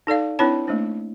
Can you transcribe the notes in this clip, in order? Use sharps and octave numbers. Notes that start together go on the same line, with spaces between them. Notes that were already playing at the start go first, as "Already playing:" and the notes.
D#4 A4 D5 F5
C4 D4 E4 B4 C#5 A5
A3 A#3 D4 C5